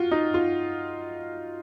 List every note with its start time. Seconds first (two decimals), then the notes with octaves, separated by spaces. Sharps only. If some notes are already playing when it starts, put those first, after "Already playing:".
Already playing: F4 F#4
0.11 D#4
0.34 F4